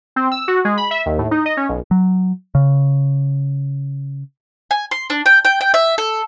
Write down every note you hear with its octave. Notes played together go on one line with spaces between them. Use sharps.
C4
E6
F#4
G#3
B5
E5
D#2
A2
D#4
D#5
C#4
B1
F#3
C#3
G#5
C6
D4
G5
G5
G5
E5
A4